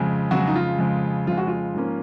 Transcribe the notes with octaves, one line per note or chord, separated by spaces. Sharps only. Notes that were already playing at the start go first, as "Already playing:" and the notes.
Already playing: F2 C#3 G#3
F2 C#3 F#3 G#3 F#4
D#4
F4
F2 C#3 G#3
F2 C#3 G#3 F4
F#4
F4
G#2 F3 A#3 C#4